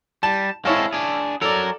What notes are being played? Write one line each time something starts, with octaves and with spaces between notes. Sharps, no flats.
G3 A5
G#3 C4 E4 A4 C#5 F5
D4 G#4
F#3 A4 A#4 D5